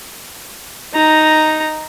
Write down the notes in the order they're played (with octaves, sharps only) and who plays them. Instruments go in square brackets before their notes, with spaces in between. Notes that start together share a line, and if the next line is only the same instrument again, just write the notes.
[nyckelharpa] D#4 A#5